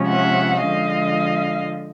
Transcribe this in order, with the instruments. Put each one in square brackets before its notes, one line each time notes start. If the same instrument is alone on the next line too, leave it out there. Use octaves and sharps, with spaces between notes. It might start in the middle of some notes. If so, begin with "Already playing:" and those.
Already playing: [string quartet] C3 F3 G#3 C#4
E5 F#5
D3 F3 G#3 D#5 F5